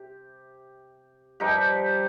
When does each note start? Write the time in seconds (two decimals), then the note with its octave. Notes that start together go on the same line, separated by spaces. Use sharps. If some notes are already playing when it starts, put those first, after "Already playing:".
Already playing: C3 G4
1.40 G2 F3 D#4 G4